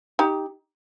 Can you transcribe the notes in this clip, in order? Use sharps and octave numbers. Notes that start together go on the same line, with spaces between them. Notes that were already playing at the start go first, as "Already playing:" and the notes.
D#4 G4